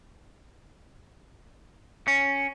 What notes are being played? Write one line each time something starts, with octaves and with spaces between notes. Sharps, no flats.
C#4